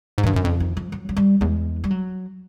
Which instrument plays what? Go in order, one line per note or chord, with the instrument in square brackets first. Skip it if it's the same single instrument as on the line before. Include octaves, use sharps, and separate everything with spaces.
[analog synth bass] G#2
[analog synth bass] G2 [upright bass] D#3
[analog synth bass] F#2 [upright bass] D3
[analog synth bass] F2 [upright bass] C#3
[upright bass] D#3
F3
F#3
F#3
G3
[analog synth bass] E2 [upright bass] G#3
[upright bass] G3
F#3